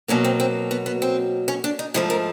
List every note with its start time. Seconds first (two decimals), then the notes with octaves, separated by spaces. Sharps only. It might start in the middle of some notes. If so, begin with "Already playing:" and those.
0.08 B2 F#3 A#3 C#4
0.24 C4
0.40 C4
0.71 B3
0.86 B3
1.02 C4
1.48 C#4
1.64 D4
1.79 D#4
1.94 G#2 F3 A3 E4
2.10 A#4